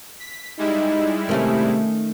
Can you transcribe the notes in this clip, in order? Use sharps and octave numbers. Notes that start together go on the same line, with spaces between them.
B6
G3 G#3 D#4 E4
C3 D#3 A3 C#4